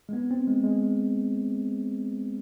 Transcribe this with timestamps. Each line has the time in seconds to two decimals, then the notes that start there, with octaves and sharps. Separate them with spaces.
0.09 G#3
0.13 B3
0.31 C4
0.47 G#3
0.64 G#3